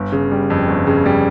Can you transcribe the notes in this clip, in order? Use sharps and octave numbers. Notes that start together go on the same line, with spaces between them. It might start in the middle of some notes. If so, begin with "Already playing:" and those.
Already playing: G1
C#3
G3
F2
G1
C#3
G3